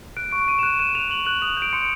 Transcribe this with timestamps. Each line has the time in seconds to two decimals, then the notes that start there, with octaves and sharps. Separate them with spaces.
0.17 F#6 D7
0.31 C#6 D7
0.48 C#6 D#7
0.59 E7
0.63 F#6 D#7
0.79 F#6 E7
0.94 C#6 F7
1.10 C#6 F#7
1.25 F#6 F#7
1.42 D#6 F7
1.57 G6
1.62 D7
1.73 C6 C#7